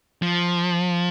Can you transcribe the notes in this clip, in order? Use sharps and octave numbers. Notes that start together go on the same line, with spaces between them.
F3